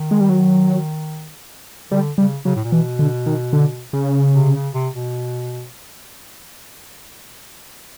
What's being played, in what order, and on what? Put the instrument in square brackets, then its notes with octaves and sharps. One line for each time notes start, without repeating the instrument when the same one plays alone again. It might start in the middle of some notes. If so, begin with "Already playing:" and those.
Already playing: [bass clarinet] D#3
[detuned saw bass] G#3
G3
F#3
[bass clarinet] D3 [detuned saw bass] G3
[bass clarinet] C#3 [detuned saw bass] G3
[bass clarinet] C#3 [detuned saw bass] F#3
[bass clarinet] A2
A#2
[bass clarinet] B2 [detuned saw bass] E3
[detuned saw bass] D3
D#3
D3
C#3
[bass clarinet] C3
C#3
C3
B2